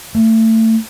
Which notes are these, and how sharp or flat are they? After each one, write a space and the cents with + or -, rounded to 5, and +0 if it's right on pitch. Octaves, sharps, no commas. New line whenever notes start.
A3 +30